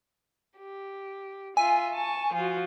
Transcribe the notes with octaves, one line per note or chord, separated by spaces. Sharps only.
G4
F4 E5 G#5
A5 C#6
F3 F4 F#4